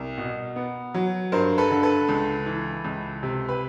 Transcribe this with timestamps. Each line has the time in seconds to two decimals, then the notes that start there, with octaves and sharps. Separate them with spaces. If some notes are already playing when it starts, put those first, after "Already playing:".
Already playing: C2 A#4
0.18 B2
0.56 B3
0.94 F#3
1.32 G2 A#4 C5
1.58 A4 B4
1.71 D3
1.83 A4 B4
2.09 C#2
2.46 E3
2.85 C#2
3.23 C3
3.49 B4